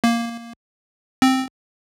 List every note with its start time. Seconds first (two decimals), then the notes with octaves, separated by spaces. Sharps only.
0.04 A#3
1.22 C4